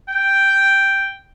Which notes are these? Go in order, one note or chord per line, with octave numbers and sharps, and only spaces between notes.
G5